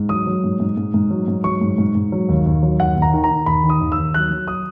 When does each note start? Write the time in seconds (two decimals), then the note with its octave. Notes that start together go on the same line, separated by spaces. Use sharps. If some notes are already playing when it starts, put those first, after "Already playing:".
Already playing: G#2
0.09 F#3 D#6
0.27 F#3
0.44 G#2
0.60 G#2
0.77 G#2
0.94 G#2
1.11 F#3
1.28 G#2
1.44 F#3 C#6
1.61 G#2
1.78 G#2
1.95 G#2
2.12 F#3
2.29 D#2
2.46 D#2
2.63 F#3
2.79 D#2 F#5
2.96 D#2
3.02 A#5
3.14 D#3
3.24 A#5
3.30 D#3
3.46 D#2 B5
3.64 D#3
3.69 D#6
3.80 D#2
3.92 E6
3.98 D#2
4.14 F#3 F#6
4.31 F#3
4.48 D#6